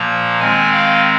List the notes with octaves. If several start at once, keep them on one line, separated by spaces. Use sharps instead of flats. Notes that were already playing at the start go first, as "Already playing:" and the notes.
Already playing: A#2 F3 A#3 A#5
D#3 G#3 C4 G#5
F5